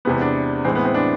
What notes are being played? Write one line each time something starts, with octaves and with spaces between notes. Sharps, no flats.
E2 C3 G#3 B3
D4
A2 E3 G#3 C4
B3
C4
D4